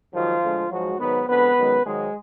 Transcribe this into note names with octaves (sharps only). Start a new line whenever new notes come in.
G#2 D#3 F3 F#3 F4
D2 D3 G#3
G#2 F3 F#3 G#3 F#4
G#2 D#3 F#3 B3 B4
F2 D3 G#3 B3 B4
F#2 D#3 G#3
G#2 D#3 F#3 G#3 G#4